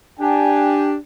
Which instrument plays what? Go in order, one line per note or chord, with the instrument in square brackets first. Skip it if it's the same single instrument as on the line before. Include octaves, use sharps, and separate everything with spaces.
[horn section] D4 G4 [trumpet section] G5 G#5